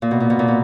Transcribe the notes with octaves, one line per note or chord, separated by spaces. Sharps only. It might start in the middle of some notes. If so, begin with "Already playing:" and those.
A#2
B2
A#2
B2
A#2
B2